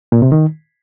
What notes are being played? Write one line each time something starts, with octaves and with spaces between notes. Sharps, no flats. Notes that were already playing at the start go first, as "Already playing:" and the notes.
A#2
C3
D#3